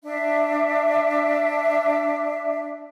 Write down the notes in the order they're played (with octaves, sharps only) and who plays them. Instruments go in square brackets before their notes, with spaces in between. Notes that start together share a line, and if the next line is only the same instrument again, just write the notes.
[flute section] D4 E5